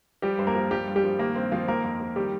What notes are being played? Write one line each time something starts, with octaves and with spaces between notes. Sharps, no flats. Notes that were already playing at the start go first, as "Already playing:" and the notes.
F3 G3 G4
G2 C5
A#3 A#4
F3
F3 G3 G4
G2
G3 G4
F3
D#3 A#3
G2 C4
D#3 F3 F4
F3 A#3 A#4
F2
F3
D#3 G3 G4